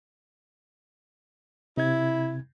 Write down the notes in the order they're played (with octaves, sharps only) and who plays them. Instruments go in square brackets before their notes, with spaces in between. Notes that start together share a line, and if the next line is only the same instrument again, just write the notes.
[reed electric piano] C3 G#6 [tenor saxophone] E4